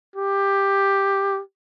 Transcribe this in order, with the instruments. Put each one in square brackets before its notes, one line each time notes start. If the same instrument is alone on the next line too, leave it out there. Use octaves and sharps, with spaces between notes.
[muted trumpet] G4